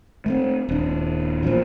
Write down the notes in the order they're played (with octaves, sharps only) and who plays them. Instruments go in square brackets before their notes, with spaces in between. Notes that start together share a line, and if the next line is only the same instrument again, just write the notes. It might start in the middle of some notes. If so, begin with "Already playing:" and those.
[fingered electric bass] A3 A#3 C4
D#1 D4
A1 A#2 C#3 F3